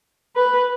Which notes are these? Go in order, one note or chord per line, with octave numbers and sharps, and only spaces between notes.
B4